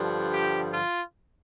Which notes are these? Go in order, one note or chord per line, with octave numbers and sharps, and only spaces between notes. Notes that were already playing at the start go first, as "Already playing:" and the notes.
Already playing: G2 D3 F3
G4
F4